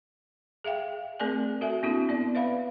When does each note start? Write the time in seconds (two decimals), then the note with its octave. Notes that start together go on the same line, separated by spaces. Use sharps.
0.64 G#4 E5 F5 G5
1.20 A3 C4 G#4 A#4 D5 G#5
1.61 F#4 A4 E5 G#5
1.83 A#3 C4 D4 E4 F#4
2.09 B3 D5
2.35 B4 E5 F5 B5